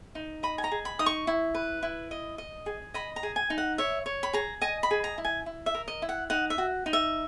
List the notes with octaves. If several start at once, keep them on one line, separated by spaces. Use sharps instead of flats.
D#4
D#5 B5
G#5
A#5
G#4
B5
D#4 D#6
C#6
E4
B4
E4
D#5
D#5
G#4
D#5 B5
A#5
G#4
G#5
D#4
F#5
C#5 E5
C#5
B5
G#4 A#5
D#5 G#5
B5
G#4
A#5
E4
G#5
E4
E5
A#4
D#5
E4
F#5
D#4 F#5
E5
F#4
D#4
E5